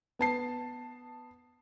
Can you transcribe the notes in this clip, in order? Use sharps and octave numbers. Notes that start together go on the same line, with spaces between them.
B3 A5 C7